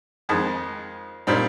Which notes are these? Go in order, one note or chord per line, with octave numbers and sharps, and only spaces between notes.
F2 D#3 G#3
A#2 G3 C4 D#4